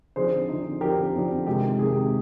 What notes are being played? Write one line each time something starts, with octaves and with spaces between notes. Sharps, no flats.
D3 F3 C4 D#4 G#4 C5
D3 F3 C4 D#4
D3 F3 C4 D#4 G4 A#4
D3 F3 C4 D#4
C3 D#3 G#3 G4
C3 D#3 G#3 G#4